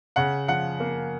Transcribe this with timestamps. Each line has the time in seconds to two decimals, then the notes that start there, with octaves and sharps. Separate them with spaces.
0.16 C#3 F#5
0.48 F3 F#5
0.80 A#3